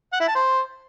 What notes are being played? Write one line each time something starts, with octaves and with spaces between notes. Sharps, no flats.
F#5
E4
A5
C5